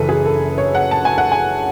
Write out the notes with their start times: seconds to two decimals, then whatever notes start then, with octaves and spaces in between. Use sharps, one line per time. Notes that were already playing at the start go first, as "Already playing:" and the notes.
Already playing: F#1 F#2 E3 A4 B4
0.09 G#4
0.26 A4
0.58 C#5
0.75 F#5
0.91 A5
1.05 G#5
1.18 F#5
1.32 G#5